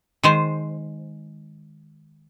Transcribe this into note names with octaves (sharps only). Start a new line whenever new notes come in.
D#3 G#3 C5